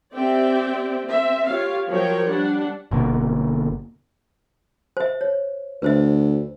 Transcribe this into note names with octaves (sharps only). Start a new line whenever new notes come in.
C4 G4 D5 E5 G5
C4 E5
F4 G4 C#5 F5
F3 F#3 A#4 C#5 G5
G3 D4 F#5
G1 B2 A#3
C5 E5
C#5
D2 B4 C5 E5